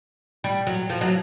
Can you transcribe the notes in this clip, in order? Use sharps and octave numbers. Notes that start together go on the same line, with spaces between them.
G3
F#3
F3
F#3